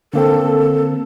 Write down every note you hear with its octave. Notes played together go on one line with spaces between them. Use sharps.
D3 A#3 C4 A4